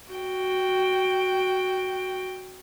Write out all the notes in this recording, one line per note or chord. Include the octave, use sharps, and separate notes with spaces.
F#4 G5